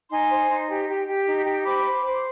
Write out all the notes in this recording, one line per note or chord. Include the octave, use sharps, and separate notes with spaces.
D#4 G#5 C6
C5
D#4
G4
G4
G4
D#4
G4
C5 B5 D6
C5
C5